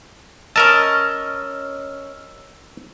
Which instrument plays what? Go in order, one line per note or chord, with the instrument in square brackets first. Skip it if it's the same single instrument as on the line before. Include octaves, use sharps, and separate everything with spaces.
[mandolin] C#4 D#5 [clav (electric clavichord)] A#4 A5 [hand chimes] E6